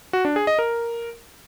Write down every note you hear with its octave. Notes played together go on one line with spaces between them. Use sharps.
F#4
D4
G#4
D#5
A#4